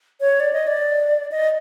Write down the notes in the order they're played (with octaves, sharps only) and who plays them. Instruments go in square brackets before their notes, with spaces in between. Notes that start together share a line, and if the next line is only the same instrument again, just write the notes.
[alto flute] C#5
D5
D#5
D5
D#5